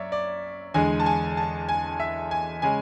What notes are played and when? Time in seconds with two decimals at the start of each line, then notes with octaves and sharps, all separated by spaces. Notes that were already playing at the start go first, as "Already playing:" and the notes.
Already playing: F#2 C#5 D5 E5
0.12 D5
0.74 E2 D3 G#3 G#5
1.00 A5
1.06 G#5
1.37 A5
1.69 G#5
2.00 E5
2.31 G#5
2.62 C#3 G#3 G#5